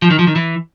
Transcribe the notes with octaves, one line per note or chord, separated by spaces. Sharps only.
F3
D#3
F3
D#3
E3